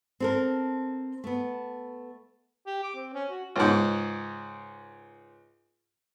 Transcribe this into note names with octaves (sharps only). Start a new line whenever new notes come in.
C4 A4 A#4
A3 B3
G4
D6
C4
C#4
F#4
C#2 G#2